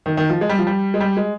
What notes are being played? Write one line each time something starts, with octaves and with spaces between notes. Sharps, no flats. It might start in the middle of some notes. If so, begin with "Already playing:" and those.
D#3
D#3
F3
G#3
G3
F3
G3
G#3
G3
G#3